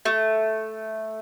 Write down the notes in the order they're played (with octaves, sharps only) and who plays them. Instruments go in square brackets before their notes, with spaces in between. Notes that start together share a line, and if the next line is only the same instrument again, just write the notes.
[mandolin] A3